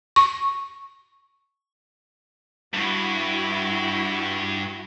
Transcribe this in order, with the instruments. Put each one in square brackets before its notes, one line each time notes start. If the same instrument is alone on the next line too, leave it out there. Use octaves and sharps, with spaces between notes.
[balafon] C#6
[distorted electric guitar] G2 [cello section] E4 F#4